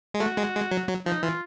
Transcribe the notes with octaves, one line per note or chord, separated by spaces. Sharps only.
G#3
A3 F#4
G#3
G#3
F#3
F#3
F3 D#4
E3 F4